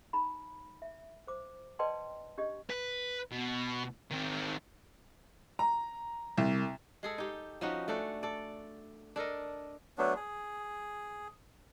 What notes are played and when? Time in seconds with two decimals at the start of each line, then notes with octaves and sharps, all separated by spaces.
0.13 D#4 A#5 B5
0.82 E5
1.27 C5 D6
1.79 B4 D5 D#5 G5 A5 C6
2.38 D4 G4 D#5
2.70 B4
3.32 B2
4.12 D#3 C4
5.59 A#5
6.38 C2
7.03 G#3 G#4 A4
7.18 D#4 G4
7.61 F3 C#4 D#4 F#4
7.88 A3 D4 A4 F#5
8.23 A4 D5
9.16 D4 A4 A#4 D#5
9.98 F#3 A3 B3 D4
10.16 G#4